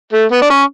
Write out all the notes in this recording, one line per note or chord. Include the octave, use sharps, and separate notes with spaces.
A3
B3
D4
C#4